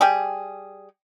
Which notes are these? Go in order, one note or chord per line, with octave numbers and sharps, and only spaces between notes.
G3 G4 G#4